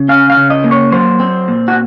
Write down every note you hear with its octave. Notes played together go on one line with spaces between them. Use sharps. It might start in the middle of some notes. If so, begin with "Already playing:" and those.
Already playing: C#3
C#4 F5
F5
C#3
D#5
A#3
C#5
F#3 C5
C4
A#2
F#4